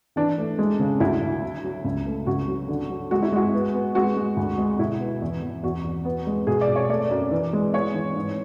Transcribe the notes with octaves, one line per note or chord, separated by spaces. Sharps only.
E3 D4
A3
G#3
C#3
D2 E4
D2
F#3
F#3
C#2
A3
C#2 F#4
F#3
D3
F#3
G#3 F#4
E4
G#3 F#4
B3
B3
G#3 F#4
G#3
D2
G#3
B2 E4
B3
E2
E2
E2 F#4
E2
B3
G#3
B2 G#4
D5
B2
C#5
A3 D5
F#2
E3
G#3
B3 C#5
E3
G#2